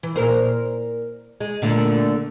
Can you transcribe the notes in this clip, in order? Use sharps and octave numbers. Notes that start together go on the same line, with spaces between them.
E3
A#2 A#4 C5
G#3
A#2 D3 A3